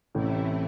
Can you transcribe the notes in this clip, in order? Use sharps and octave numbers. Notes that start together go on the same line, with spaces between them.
A1 A2 C3 E3 A3 E4